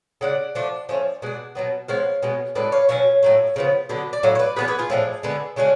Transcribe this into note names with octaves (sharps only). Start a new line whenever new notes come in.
C#3 G#3 D4 D5 F#5
F3 A3 D4
F3 A3 C#4
B2 G#3 D4 F#5
B2 F#3 B3
F3 G#3 B3 C#5 F5
B2 G#3 B3
A2 G#3 D4 B4 D5
C#5 F5
B2 F#3 C#4 C#5 F5
A2 F#3 A3
C#3 F3 B3
D3 F#3 B3 D4
D5
A2 F#3 F5
C#5
B4 D5
F3 B3 D4 G#4 B4
G#4 B4
F4 G#4
A2 F3 B3 D4
D3 G#3 B3 D4
C#3 G#3 C#4 D4 F#4